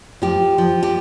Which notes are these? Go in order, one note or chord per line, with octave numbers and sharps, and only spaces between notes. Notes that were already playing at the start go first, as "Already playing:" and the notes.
F3 G4
F3
G4